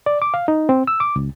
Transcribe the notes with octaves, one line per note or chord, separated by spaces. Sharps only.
D5
D6
F5
D#4
C4
E6
D6
C#2